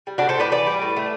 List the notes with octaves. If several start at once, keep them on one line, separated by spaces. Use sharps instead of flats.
G3
A2 D4 F#4
A4 C5
A2 B4 D5
E3 B4 D5
G3
A2
A3